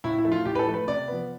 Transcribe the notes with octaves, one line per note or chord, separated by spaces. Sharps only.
A2 E4
E4
F3 A3
F4
A2 G4
B4
A4
F3 A3
B4
C3 D5
F3 B3